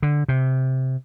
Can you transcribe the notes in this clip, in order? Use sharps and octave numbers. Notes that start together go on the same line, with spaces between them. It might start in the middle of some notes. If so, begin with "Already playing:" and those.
D3
C3